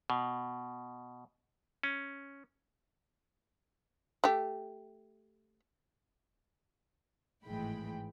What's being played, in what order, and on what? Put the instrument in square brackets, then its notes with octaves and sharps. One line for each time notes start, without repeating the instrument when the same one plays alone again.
[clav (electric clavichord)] B2
C#4
[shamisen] A3 G4
[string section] G#1 A2 E3 G#3 G5 B5